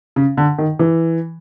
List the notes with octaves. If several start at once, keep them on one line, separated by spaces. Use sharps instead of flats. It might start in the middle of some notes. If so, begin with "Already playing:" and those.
C#3
D3
D#3
E3